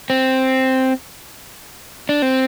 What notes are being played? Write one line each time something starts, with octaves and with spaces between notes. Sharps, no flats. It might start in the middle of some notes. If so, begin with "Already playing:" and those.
C4
D4
C4